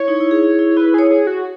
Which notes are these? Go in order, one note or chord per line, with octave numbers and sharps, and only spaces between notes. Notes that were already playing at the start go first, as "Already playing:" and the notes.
Already playing: E4 C#5
D#4
E4
G#4
E4
E4
E4 B4
G#4 C#5
G#4
F#4